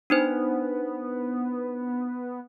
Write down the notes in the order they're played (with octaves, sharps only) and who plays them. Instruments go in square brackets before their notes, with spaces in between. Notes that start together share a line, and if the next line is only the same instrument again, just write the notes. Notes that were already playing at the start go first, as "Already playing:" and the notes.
[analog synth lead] B3 [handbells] D4 D#4 C5